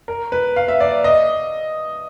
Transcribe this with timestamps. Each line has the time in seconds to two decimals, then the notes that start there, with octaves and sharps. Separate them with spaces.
0.08 A#4
0.32 B4
0.56 F5
0.68 E5
0.80 D5
1.04 D#5